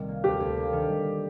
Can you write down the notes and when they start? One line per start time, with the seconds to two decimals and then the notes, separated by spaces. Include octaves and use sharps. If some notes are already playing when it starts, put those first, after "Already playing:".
Already playing: C2 A#2 D#3 G3
0.09 A#3
0.24 D2 G4
0.40 D2
0.58 A#3
0.73 D#3
0.89 G3